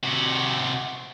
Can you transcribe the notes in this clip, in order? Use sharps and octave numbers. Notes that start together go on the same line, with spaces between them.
C3 F#4